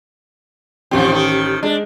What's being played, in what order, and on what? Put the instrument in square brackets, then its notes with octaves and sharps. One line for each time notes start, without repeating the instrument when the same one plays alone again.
[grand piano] A1 C#4 G4 [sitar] D#3 F3 C4
[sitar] D#3 A4
[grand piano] G#3 [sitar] D4